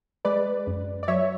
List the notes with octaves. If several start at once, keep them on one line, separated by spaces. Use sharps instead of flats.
G#3 B4 D5
F#2
D5
F#3 C#5 E5